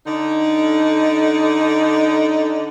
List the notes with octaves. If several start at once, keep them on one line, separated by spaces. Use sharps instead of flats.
D3 D#4